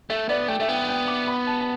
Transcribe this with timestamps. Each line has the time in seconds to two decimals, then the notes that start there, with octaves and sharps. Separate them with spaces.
0.10 A3 E5
0.29 B3 D5
0.48 A3 G5
0.60 A3 E5
0.68 B3 G5
0.88 G5
1.08 D6
1.27 B5
1.47 A5
1.61 A5